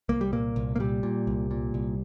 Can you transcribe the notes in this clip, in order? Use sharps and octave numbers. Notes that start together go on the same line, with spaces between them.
C2 A#3
G3
A#2 A#3
C2
A#3
A#2 G3
A#2
C2
A#2
C2